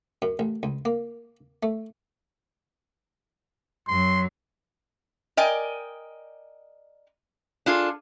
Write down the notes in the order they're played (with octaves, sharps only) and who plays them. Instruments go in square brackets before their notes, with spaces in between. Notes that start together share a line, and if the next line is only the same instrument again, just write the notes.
[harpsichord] F#2
A1
C#2
A#3
A3
[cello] F#2 F#3 [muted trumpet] C6
[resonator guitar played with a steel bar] A#4 D5 D#5 G5 G#5
D4 F4 G#4 A4